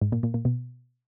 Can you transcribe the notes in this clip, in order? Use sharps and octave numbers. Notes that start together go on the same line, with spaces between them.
G#2
A#2
A#2
A#2
B2